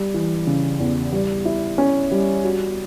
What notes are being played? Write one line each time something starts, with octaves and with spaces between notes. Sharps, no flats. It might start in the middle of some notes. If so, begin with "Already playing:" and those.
Already playing: G3
E3
C#3
E2
G3
E4
C#4
G3
F#4